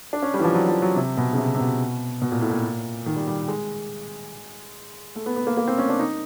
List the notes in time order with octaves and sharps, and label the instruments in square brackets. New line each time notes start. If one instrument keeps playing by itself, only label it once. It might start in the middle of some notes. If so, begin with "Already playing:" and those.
[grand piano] D4
C#4
G3
E3
F3
F#3
F3
F#3
C3
B2
C#3
C3
C3
B2
B2
A#2
A2
A#2
D#3
G3
G3
G#3
A3
B3
B3
A#3
A#3
C4
C#4
D4
D#4